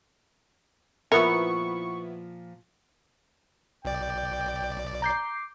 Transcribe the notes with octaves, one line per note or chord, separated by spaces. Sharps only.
A#2 F3 B3 E4 A#4 C#6
B1 D5 G5
A#5 D6 G6 C7